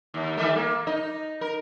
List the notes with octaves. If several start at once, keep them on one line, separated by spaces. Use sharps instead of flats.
D#2
D#3 G3 A3
A#3
D#4 D#5
A#4